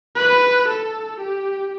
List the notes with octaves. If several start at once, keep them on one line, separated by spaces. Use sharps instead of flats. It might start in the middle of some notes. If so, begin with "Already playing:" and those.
B4
A4
G4